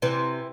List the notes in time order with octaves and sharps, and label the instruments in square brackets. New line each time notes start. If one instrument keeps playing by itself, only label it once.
[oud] C3 E3